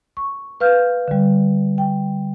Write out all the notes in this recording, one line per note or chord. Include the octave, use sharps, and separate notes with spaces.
C#6
B4 F5 F6 G6
D3 G3
G5